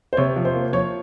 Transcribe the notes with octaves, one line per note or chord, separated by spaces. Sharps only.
C5
C3 C#5
F3
C5
A#3
F3 C#5